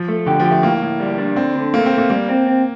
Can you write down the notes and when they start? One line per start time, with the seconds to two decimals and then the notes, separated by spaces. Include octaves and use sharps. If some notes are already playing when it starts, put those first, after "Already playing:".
Already playing: F3
0.08 A3
0.26 D3 G4
0.40 F3
0.45 G4
0.51 A3
0.63 A2 A#3
0.82 A2
1.00 G3
1.18 D4
1.36 D2 C4
1.55 D3
1.74 A3 A#3
1.86 C4
1.92 A3
1.98 A#3
2.10 G3 A#3
2.29 C4
2.47 C4